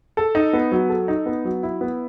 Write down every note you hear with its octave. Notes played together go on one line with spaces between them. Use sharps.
A4
D#4
B3
F#3
A4
D#4
B3
F#3
E4
B3